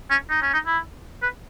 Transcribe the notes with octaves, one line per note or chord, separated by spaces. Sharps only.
C#4
D#4
C#4
D#4
E4
B4